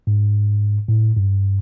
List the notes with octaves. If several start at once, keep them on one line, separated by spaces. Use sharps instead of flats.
G#2
A2
G2